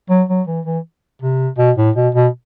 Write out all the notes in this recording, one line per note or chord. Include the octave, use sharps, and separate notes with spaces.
F#3
F#3
E3
E3
C3
B2
A2
B2
B2